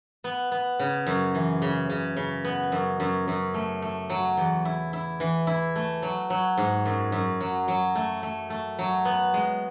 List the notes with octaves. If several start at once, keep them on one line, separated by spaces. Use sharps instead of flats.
B3
B3
C#3
F#2
E3
C#3
C#3
C#3
B3
F#2
F#2
F#2
A3
A3
F#3
E2
E4
E4
E3
E4
A3
F#3
F#3
G#2
F#2
F#2
F#3
F#3
A3
A3
A3
F#3
B3
G#3